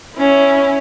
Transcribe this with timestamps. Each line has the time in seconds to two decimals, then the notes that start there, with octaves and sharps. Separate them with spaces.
0.16 C#4 E4